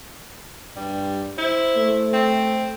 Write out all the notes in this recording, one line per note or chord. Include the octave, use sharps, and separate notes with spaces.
G2 G3
E4 C5
A3
C4